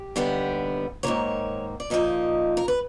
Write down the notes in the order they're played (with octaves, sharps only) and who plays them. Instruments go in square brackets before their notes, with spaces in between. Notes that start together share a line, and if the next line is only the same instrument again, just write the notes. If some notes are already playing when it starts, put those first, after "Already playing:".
Already playing: [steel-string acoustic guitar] G4
D#2 D3 G3 B3
G#2 D#3 F#3 A#3 C#5
D5
A#2 F3 A#3 D#4 D#5
A#4
B4